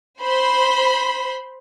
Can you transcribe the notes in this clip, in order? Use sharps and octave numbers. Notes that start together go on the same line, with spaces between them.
C5 B5 C6